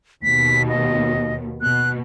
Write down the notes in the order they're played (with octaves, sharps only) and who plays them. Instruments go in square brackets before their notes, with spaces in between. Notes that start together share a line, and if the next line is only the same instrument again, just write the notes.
[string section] D#2 B2 [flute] B6
[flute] D#5
[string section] B2 [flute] F#6